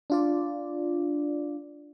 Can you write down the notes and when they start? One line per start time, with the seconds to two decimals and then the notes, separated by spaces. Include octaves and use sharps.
0.10 D4 F4 D5